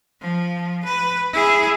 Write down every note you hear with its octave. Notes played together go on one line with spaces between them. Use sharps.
F3
B4
E4 G#4